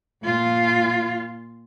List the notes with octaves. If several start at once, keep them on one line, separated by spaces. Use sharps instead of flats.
A#2 F4